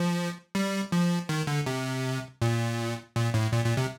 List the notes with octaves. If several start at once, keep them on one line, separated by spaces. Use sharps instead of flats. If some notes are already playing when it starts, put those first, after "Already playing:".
Already playing: F3
G3
F3
D#3
D3
C3
A#2
A#2
A2
A#2
A#2
C3